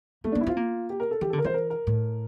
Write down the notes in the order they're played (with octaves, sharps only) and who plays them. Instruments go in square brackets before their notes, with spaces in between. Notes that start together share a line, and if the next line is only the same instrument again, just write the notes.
[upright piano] A3 [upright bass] A#3
[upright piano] D4
[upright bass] A#3
[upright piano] E4
[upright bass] C4 [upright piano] F4
[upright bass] A#3
[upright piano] G4
A#4
A4
[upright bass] E3 [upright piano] G4
[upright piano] A4
[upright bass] D3
[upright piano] A#4
[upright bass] E3 [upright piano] C5
[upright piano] A#4
A#4
[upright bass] A2